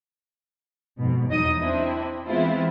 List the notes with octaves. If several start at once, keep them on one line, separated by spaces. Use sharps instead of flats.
F2 G#2 B2
E2 F#3 D#4 D#5 D#6
C4 D4 E4
E3 G#3 B3 C4 E4 F4